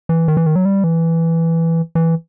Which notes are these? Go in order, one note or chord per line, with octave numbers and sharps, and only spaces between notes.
E3
D#3
E3
D#3
F#3
G3
E3
E3